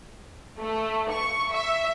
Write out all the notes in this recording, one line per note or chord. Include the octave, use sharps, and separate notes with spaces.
A3
C#6
E5